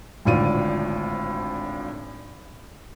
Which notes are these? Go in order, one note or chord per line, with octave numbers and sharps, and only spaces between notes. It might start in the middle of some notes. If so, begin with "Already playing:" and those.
G#1 D2 A2 F4 D5 D#7